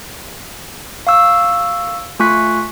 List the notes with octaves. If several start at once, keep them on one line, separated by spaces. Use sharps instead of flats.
F5 C#6 E6
A3 F4 G#5 C#6 F#6 B6